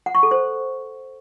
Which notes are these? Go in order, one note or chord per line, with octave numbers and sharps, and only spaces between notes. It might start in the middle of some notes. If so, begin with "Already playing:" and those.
F#5
C#6
A4
C5